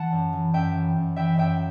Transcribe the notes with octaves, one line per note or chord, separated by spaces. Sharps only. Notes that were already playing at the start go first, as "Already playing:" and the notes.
Already playing: E3 F#5 A5
F#2
E3
F#2 E5 G5
E3
F#2
E3 E5 G5
F#2 E5 G5